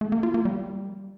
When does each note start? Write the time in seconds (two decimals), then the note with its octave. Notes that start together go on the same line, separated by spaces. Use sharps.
0.01 A3
0.12 A#3
0.23 F4
0.34 A#3
0.45 G3